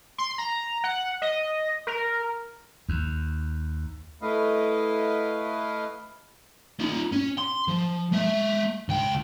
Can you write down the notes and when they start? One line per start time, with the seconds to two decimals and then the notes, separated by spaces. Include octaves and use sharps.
0.18 C6
0.38 A#5
0.84 F#5
1.22 D#5
1.87 A#4
2.89 D#2
4.22 A3 E4 B4 D#5 F5
6.80 D#4 F4
7.13 C#4
7.38 C6
7.68 F3
8.12 G#3 E5
8.89 C#2 G5